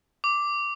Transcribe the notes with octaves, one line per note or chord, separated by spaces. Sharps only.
D6